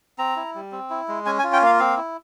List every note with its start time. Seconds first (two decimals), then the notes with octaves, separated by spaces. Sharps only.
0.19 C4 A#5
0.36 E4
0.55 G3
0.72 C4
0.90 E4
1.08 G#3
1.26 C#4 G#5
1.39 G#5
1.44 F4
1.53 G5
1.62 A#3 F5
1.79 C4 F5
1.97 E4